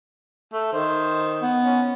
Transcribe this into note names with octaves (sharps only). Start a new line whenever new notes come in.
A3
D#3 C5
B3
C#4